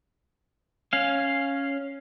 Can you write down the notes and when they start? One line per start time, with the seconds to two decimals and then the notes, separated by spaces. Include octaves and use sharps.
0.93 C#4 F5